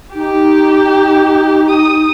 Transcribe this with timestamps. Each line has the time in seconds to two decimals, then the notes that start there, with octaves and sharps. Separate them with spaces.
0.15 D#4 G4
1.69 D#6